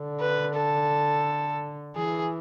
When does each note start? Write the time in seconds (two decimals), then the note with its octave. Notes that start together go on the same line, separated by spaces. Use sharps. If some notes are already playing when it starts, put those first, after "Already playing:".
Already playing: D3
0.20 B4
0.55 A4
1.97 E3 G#4